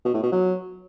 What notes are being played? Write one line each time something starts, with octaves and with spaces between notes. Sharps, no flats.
B2
A2
B2
F#3